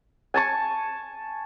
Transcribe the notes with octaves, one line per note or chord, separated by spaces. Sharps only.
G#5 A5 C#6